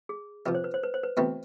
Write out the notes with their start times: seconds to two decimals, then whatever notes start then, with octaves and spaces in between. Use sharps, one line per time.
0.09 G#4
0.46 F2 C3 F3 B4
0.55 C5
0.64 B4
0.74 C5
0.83 B4
0.94 C5
1.03 B4
1.17 E2 B2 A3 C4 E4 B4